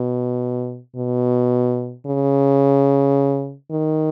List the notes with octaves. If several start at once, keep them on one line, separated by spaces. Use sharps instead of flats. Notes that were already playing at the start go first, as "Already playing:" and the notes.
Already playing: B2
B2
C#3
D#3